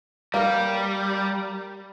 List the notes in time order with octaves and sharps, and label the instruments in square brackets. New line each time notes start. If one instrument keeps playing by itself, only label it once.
[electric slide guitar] G3 [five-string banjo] A#3 A#4